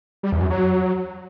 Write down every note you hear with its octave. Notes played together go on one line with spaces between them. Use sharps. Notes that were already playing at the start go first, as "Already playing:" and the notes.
G3
E2
F#2
F#3